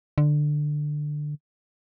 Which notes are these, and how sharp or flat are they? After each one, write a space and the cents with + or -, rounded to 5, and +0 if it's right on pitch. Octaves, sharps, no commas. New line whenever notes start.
D3 +15